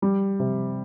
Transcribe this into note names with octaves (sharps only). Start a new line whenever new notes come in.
G3
C3